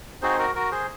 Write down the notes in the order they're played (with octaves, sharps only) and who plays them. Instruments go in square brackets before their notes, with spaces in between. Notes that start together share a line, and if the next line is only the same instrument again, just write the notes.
[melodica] C4 D#4 F#4 G#4 C5
F#4 A#4
F#4 A#4
G#4 C5